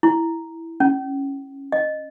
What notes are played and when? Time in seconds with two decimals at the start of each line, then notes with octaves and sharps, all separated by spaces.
0.03 E4
0.80 C#4
1.72 D#5